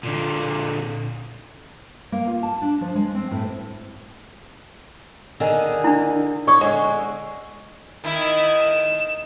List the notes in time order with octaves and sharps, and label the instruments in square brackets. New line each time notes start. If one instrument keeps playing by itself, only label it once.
[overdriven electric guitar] A#2 D3
[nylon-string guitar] A#3
F4
A5
D4
F3
G#3
C4
A2
C5
[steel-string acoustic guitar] D3 D#3 G#4
[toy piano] D4 E4
[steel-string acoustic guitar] C#5 [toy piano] D5 C#6 D#6
[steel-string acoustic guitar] D3 G#3
[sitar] D#3 [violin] E4
[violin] E7